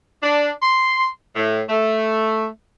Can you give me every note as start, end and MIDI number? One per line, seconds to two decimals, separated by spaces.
0.23 0.50 62
0.62 1.08 84
1.36 1.62 45
1.70 2.46 57